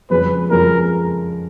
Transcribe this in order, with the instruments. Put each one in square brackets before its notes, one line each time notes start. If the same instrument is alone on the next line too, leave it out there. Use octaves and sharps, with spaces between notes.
[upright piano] F2 C#3 F3 G#3 C#4 [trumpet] B4
[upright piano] F2 C#3 F3 G#3 C#4 [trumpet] A#4